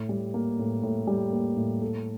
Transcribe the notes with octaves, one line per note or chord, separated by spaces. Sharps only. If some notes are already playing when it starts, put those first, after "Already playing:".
Already playing: A2
G3
A#3
A2
A2
G3
A#3
A2
A4